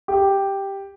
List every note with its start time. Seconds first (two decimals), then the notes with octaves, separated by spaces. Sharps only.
0.08 G4